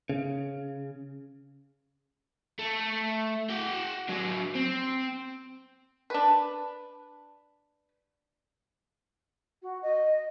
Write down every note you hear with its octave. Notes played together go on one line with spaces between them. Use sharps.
C#3
A3
F#4 G5
F#3 D4
C4
D4 B4
F#4
D#5